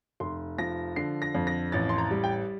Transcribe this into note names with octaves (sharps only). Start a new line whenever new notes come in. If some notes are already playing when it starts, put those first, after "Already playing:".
F1 C6
F3 A#6
D3 C7
A#6
F2
A#6
A1 A6
C6
A#5
G3
G5